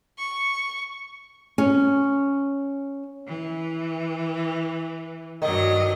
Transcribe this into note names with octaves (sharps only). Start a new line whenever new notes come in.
C#6
C#4
E3
G2 D#3 F#3 D#5